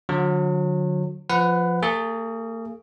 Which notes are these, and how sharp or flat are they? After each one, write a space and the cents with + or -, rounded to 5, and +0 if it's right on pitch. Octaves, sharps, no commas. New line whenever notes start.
D3 +0 F#3 -35
F3 +0 B4 +20 F#5 -10
A#3 -45 G#4 +0